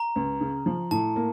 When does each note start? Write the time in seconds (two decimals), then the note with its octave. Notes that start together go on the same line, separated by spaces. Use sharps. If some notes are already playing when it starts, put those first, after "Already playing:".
Already playing: A#5
0.16 C#2
0.41 C#3
0.66 F3
0.91 A2 A5
1.16 A#3